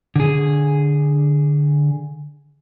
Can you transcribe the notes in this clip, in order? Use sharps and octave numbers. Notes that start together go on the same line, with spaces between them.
D3 G#4